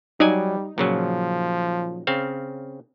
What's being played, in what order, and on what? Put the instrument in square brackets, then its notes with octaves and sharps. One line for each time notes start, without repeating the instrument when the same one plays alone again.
[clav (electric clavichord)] F#3 D5 G#5 [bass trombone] G3 [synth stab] D#4
[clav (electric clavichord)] A#2 C#3 F#3 [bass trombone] F3
[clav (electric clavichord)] C#3 C4 F5